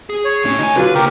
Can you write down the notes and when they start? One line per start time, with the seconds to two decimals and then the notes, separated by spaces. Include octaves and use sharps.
0.10 G#4
0.25 C#5
0.45 A2 C#4
0.59 D2 D#4 G#5
0.76 D3 F#3 F4 B4
0.95 C#3 A#3 G4 A#4